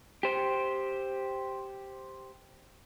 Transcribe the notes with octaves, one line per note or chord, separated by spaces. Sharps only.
G4 C5